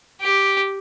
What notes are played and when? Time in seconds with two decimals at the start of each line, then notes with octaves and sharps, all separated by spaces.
0.21 G4